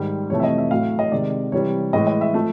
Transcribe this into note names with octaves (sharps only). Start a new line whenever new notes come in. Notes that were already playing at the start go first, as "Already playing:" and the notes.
Already playing: G#2 D#3 G3
F2 C3 E3 A3 C#5
E5
D#5
E5
A2 F#3 A3 F5
D#5
C3 D#3 G#3 D5
C3 E3 G3 C#5
A2 E3 G#3 D#5
D#5
E5
F3 A3